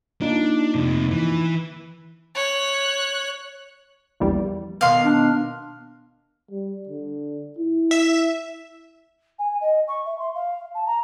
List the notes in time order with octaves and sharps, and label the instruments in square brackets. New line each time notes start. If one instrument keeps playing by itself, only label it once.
[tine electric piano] A#3 D#4 F4 [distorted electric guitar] D4
[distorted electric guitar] F2 C3
E3
[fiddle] C#5 F#6
[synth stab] A#1 E2 G3
[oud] B2 D#3 B3 [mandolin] F5 C6
[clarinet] D4
[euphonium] G3
D3
E4
[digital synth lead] E5
[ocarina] G#5
D#5
C#6
E5
C6
F5
A5
A#5